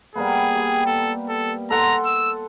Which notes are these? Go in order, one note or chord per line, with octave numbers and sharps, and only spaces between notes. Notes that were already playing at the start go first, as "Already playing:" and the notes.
G3 A#3 B3 G#4
G4
A4
A4
A4 F#5 A#5 C6
E6